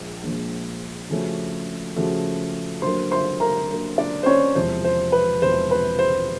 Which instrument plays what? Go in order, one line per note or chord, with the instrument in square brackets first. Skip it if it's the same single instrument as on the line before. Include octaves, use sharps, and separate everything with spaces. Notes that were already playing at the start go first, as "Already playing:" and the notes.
Already playing: [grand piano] A#1 A#2 F3 G#3
A#1 A#2 F3 G#3
C#3 F3 A3 C#4 F#4
C#3 F3 A3 C#4 F#4
[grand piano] D3 F#3 A#3 [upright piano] C5 C6
[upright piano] C5 C6
A#4 A#5
[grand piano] D3 F#3 A#3
[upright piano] D4 D5
C5
C#4 C#5
[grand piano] E1 E2 C3 F3 [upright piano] C5
[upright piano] C5
B4
[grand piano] E1 E2 C3 F3 [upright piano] C5
[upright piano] B4
C5